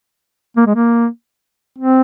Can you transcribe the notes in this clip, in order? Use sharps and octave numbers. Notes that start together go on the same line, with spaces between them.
A#3
G#3
A#3
C4